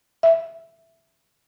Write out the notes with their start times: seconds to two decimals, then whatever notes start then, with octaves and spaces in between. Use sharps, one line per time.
0.23 E5